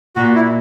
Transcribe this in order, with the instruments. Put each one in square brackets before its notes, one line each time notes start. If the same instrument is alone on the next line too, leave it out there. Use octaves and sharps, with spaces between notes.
[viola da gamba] A#2 [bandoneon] F#4
[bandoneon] E4